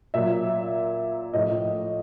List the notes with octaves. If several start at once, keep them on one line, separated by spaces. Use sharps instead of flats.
A#2 F#3 E5
A2 F3 D#5